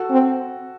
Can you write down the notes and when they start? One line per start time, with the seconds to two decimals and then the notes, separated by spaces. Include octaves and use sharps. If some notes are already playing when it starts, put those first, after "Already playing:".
Already playing: F#4 A4
0.11 C4